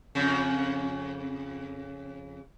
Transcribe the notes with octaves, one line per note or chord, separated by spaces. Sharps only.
F2 C#3